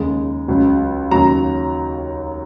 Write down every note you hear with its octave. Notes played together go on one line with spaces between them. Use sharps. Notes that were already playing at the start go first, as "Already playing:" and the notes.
Already playing: D#2 C#3 G#3
C#2 C#3 F#3
D#2 C#3 F#3 A#5